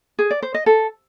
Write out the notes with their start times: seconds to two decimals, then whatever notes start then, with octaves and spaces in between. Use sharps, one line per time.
0.19 G#4
0.31 D5
0.42 C5
0.54 D#5
0.66 A4